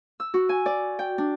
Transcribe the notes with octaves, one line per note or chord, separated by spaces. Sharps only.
E6
F#4
G#5
D5
G5
D4